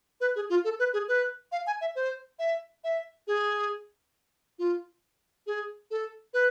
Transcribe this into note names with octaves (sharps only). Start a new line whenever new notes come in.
B4
G#4
F4
A4
B4
G#4
B4
F5
G#5
E5
C5
E5
E5
G#4
F4
G#4
A4
B4